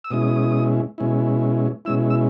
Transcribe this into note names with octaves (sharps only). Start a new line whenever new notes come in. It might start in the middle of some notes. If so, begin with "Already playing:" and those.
E6
B2 G#3 C#4 E4 D#6
B2 G#3 C#4 E4
B2 G#3 C#4 E4 E6
E6